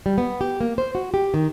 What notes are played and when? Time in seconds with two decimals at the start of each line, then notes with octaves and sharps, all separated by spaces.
0.06 G3
0.18 B3
0.41 G4
0.61 A#3
0.78 C5
0.95 F#4
1.14 G4
1.34 D#3